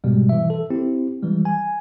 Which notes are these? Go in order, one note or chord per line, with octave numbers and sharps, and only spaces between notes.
G#2 B2 G3 G#3
E3 E5
A4
C4 E4 G4
E3 G3 G#3
G#5